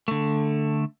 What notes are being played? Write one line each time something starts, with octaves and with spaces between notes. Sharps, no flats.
D3 A3